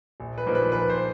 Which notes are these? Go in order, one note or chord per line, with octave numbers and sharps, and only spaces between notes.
A#1
B4
A#2 F3 A#3 D#4
B4
A#1 B4
C5